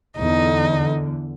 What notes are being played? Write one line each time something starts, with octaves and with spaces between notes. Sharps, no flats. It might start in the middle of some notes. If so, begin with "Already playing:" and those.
E2 D3 D#4